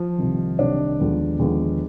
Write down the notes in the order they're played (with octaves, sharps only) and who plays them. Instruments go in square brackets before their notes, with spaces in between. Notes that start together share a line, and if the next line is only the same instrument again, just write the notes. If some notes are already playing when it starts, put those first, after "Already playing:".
Already playing: [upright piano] F3
[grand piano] C2 C3 D#3
[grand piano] C2 C3 D#3 [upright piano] D4
[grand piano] D#2 D3 F3 G#3 B3
D#2 D3 F3 G#3 B3